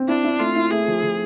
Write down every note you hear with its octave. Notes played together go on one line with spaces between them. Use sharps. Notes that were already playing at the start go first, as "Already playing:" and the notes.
Already playing: C4
D4 E4
E4
A3 F4
E4
A3 G#4
F3
F3